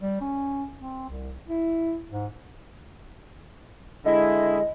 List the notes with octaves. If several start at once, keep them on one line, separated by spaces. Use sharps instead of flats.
G3
C#4
C4
C2
E4
G#2
D3 G#3 E4 D#5